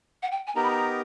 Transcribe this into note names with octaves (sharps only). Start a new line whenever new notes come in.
F#5
G5
G#5
B3 D#4 G4 A#4 A#5
B5
A#5